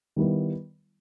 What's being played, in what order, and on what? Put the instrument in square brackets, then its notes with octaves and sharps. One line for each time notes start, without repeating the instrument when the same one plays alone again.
[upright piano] D#3 G3 B3 E4